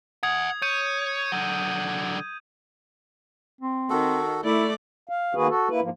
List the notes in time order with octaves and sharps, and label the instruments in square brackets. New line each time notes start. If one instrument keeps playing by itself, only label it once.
[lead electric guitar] E5 F#5 [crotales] D#6 G#6
[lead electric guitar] C#5 [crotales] G6 D#7
[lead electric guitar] D3 F#3
[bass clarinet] C4
[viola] D#3 [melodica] F#4 A4
[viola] A3 D5 [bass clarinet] E4
[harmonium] F5
D#3 A#3 F#4 G#4 B4
F#4 A4
A#3 E4 B4
G#2 F3 A#3